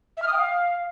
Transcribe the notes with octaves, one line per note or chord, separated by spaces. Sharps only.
E5
F6
D#6
G5
F5